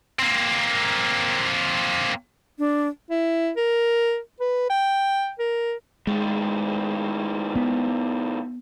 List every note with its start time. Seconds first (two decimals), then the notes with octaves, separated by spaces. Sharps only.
0.19 A#3 C4
2.59 D4
3.11 E4
3.57 A#4
4.40 B4
4.70 G5
5.39 A#4
6.07 A2 D#3 G#3
7.56 B3